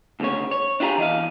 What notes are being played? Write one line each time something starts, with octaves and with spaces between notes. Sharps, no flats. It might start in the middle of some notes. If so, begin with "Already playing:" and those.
D2 G#2 C#3 C#5
C#5
D4 E4 F4 G4 G#4 A#5
E3 D#5 F5